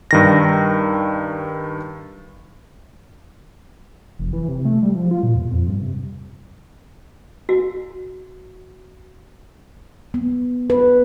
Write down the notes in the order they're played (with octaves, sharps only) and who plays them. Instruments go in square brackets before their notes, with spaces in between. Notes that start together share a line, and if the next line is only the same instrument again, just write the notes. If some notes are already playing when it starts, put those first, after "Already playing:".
[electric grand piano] G2 D#3 A#6
[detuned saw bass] F1
E3
C3
A3
G3
F3
F4
A#2
E2
F2
G2
C3
[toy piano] F#4
[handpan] B3
B4